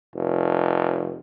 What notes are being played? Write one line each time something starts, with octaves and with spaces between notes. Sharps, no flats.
F1